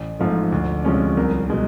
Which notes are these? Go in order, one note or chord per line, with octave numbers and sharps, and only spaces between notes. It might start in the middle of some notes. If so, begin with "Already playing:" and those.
Already playing: A1
G#2 F3 A3
D2
C3 F3 G#3 C#4
C2 A#4
B2 G#3